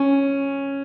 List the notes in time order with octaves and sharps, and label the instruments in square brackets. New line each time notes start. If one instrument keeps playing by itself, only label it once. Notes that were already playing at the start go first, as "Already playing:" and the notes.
Already playing: [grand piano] C#4